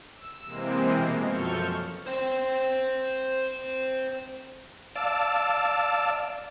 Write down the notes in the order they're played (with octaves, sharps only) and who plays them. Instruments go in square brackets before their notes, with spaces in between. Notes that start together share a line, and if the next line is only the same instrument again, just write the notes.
[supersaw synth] E6
C3 E3 G#3 A#3 C4
B2
F#2 F3 A4 C#6 F6 G6
[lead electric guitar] C5 G5
[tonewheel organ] D5 F5 A5 E6